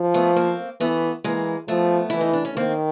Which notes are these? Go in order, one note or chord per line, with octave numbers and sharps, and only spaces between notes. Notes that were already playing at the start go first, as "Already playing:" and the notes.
Already playing: F3
A3 B3
A#3 C4
E3 A3 B3
E3 G#3 A#3
F3 A3 B3
E3 E4
D#4
D4
C#4
D#3 A#3 C4